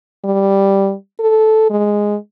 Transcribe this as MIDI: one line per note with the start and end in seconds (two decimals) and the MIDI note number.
0.24 0.94 55
1.19 1.69 69
1.70 2.16 56